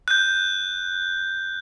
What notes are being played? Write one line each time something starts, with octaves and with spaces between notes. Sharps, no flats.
F#6 G6